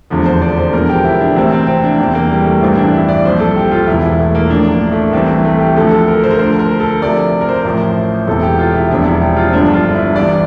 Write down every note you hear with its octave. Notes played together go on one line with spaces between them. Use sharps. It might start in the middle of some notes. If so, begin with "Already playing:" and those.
F1 E2 D3 F3
C5
D5
C5
E1 E2 D3 F3 A#4
G4
E4
D4
D2 C3 E3 C4
C4
C4
D4
E2 C3 E3 C4
A#3
G3
A3
A1 G2 E3 C4
D4
E4
D5
C2 A#2 F3 C5
A4
G4
F4
E1 E2 E3 E4
E4
A3
A#3
A1 A2 F3 D4
A#3
A3
C2 C3 E3 C4
A3
A3
G4
D2 D3 F3 A4
A4
A#4
C5
A#4
D2 D3 F3 C5
A#4
A4
D2 C3 F3 D5
A#4
C5
A1 A2 F3
E1 E2 C3 E3 A4
G4
F4
E4
E1 E2 C3 F3 D4
E4
G4
F4
C4
G1 G2 D3 F3 D4
F4
E4
C2 C3 E3 D5